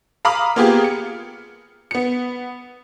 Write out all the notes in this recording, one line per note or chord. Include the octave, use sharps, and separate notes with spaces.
F5 A#5 B5 D6 D#6 F6
A#3 B3 F4 G4 G#4
C#7
B3 C#7